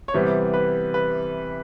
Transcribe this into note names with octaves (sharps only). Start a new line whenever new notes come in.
C#5
C3 E3 G3 B3 C5
B4
B4